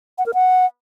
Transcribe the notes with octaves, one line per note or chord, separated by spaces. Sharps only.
F#5
A#4
F#5